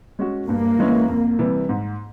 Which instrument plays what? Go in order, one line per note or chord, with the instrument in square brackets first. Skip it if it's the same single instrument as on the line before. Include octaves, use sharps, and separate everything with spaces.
[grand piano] G#3 C#4 F#4
[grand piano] G2 [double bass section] A#3
[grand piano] E3 G#3 C#4 E4
F2
C3 E3 G3
G#2